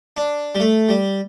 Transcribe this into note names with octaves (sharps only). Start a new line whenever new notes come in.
D4
G3
A3
G3